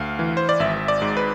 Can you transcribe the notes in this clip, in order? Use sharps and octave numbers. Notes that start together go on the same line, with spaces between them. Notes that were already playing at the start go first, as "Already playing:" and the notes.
Already playing: D2 F5
E3
C5
D5
G#1 E5
D5
G#2
B4